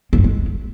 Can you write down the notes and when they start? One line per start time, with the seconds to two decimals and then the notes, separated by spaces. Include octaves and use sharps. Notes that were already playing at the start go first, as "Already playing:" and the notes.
0.13 C4
0.18 G2
0.24 G#3